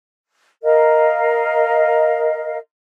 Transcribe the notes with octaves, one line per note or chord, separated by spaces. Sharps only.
A#4 D#5 F5